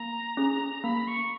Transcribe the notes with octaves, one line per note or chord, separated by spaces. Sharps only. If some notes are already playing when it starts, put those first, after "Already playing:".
Already playing: A#3 A#5
C#4 G#4
A#3 B5
C#6